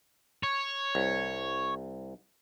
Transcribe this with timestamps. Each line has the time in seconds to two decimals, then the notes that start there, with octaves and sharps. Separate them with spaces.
0.43 C#5
0.95 C2